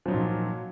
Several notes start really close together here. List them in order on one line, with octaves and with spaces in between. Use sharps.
F3 F#3 D#4 A#2